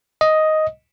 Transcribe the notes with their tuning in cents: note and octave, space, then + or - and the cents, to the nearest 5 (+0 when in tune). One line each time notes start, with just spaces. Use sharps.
D#5 +5